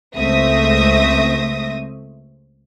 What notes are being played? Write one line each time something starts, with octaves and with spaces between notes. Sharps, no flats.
C#2 A3 C4 E5 D#6 A#6